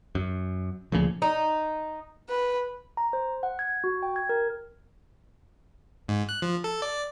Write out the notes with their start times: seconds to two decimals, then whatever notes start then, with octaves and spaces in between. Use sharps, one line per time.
0.15 F#2
0.92 D2 A#2 C#3 F3
1.22 D#4
2.29 B4
2.97 A#5
3.13 C5
3.43 F#5
3.59 G#6
3.84 F#4
4.03 G5
4.16 G#6
4.29 A#4
6.08 G#2
6.29 F#6
6.42 F3
6.64 A4
6.82 D5